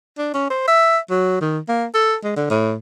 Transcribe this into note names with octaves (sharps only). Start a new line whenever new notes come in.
D4
C#4
C5
E5
F#3
D#3
A#3
A4
G#3
D3
A2